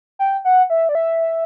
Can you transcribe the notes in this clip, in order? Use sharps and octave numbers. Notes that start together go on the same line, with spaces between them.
G5
F#5
E5
D5
E5